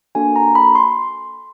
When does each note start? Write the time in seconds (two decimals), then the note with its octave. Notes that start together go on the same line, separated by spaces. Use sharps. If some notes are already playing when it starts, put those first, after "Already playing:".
0.15 A#3 D4 F#4 A4 G#5
0.36 A#5
0.55 B5
0.75 C6